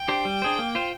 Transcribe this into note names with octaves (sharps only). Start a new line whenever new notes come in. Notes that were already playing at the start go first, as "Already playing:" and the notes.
Already playing: G5
D4 G4 C5
G3
D4 G#4 C5
A#3
F4 C5